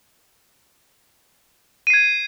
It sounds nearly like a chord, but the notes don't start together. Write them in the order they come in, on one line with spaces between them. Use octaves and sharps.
D#7 C7 G#6